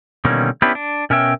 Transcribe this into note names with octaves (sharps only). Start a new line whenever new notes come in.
B2 D3 D#3 G3 A#3 C#4
B3 C#4 D4 E4 G4 B4
D4
B2 C#4 A#4 C#5 E5 G5